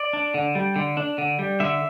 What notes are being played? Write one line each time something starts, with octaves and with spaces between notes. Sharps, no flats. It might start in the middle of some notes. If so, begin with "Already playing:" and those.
Already playing: D5
D4
D3
G3
D3
D4
D3
G3
D3 E5